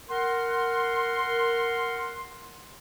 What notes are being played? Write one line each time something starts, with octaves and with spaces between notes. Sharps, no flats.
A#4 F#5 C6